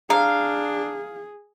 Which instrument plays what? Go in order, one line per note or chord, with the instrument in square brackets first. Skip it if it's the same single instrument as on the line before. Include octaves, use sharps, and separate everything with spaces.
[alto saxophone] D4 [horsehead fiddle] G#4 [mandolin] F5 [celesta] A#5